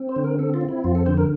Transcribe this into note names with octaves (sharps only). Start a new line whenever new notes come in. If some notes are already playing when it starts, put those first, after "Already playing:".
Already playing: C4
C5
D3
A#4
C4 A4
F4
C4
E4
F2 F4
A4
D3 C5
A#4